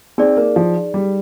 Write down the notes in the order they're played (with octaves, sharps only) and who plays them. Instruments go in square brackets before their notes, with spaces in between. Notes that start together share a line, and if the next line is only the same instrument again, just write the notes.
[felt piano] C4 [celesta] D#4 G#4 D5
[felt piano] A#3
F3
G3